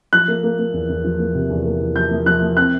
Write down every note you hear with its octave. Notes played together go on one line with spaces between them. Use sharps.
F3 F#6
A#3
A#3
A#3
E2
E2
F3
A#3
C3
E2
A#3
E2
F3 G6
A#3
F3 F#6
A#3
C4 F#6